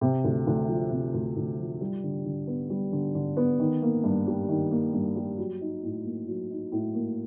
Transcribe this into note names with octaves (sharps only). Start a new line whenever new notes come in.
C3
D2
D2
F3
C3
D2
D2
F3
G3
D3
D3
B3
G3
D3
D3
B3
D#3
A#3
G2
G3
D#3
A#3
G2
G3
F#3
D#4
A2
A#3
F#3
D#4
A2
A#3